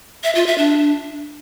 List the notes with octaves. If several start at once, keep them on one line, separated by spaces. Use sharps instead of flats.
E5
F4
E5
D4